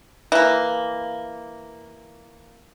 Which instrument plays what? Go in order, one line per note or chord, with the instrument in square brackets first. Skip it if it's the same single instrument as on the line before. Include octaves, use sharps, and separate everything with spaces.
[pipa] E3 A#3